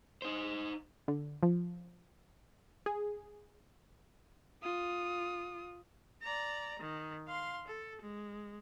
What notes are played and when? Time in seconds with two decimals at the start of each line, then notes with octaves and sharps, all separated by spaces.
0.22 D#4 C5
1.08 D3
1.43 F3
2.86 G#4
4.63 F4 D#6
6.22 D5 A#5
6.79 D#3
7.28 F5 C6
7.67 A4
8.01 G#3